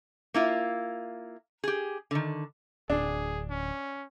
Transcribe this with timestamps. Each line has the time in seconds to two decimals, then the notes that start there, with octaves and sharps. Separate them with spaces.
0.34 A#3 E4 F4
1.64 G4 G#4
2.11 D3 D#3
2.90 D1 D4 G#4
3.50 C#4